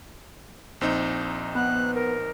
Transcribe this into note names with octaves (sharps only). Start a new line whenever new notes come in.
A#1 C4 D#4
B3 F#6
A#4